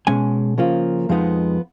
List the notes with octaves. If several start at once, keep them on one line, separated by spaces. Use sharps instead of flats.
B2 G#3 C#4 G#5
C#3 F3 A#3 F4
F2 F3 G#3 B3 D#4